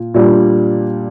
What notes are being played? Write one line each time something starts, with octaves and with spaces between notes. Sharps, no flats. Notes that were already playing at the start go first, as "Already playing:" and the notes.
Already playing: A#2
A#2 G3 D4